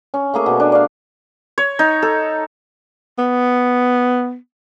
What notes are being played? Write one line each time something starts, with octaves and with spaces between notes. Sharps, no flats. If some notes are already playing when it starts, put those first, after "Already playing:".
C#4
A3 A#3 G#4
B2
D4
D5 F5
C#5
D#4
A4
B3